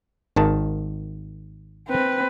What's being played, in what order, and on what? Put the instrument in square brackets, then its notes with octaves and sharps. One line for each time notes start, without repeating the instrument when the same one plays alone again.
[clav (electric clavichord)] G#1 D#3 A5
[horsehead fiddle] C4 B4